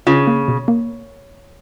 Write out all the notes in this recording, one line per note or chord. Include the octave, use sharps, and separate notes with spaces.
C#3 F4
A#3
B2
A#3